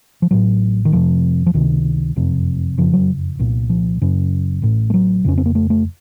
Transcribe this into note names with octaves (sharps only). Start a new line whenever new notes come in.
F3
A1 A2 F#3
D#3
F1 F2 C3 F3
F3
C#2 C3 D#3
F#1 F2 C3
F#1 F2 C#3 F3
F#3
C2 A#2
F3
F#1 F#2 C#3
A1 A2
A3
F#3
F1 F2 C#3 C#4
C4
A#3
A3
A3